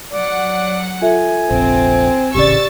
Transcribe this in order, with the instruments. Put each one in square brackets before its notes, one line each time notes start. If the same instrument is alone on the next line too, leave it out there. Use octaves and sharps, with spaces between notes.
[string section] F#3 F#5 [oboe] D5
[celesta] F4 A4 E5 [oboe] G#5
[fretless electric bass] F1 A#1 [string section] C4
[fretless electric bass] D#1 A1 C#3 [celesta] G4 D5 [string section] C#6 E6 A6